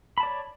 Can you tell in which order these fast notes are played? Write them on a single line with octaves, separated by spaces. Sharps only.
B5 A5 D5 C#5